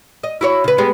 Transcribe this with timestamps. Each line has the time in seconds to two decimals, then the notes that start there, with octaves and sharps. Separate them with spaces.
0.24 D#5
0.41 E4 F#4 C#5
0.64 C#3 B4
0.78 G3 G#3 B3